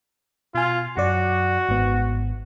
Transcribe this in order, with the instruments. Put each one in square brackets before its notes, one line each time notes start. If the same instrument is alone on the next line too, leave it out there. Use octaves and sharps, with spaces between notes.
[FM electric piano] B2 G#5 [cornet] F4
[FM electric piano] F#2 F#3 D5 [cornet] F#4
[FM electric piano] G#1 G#2 B3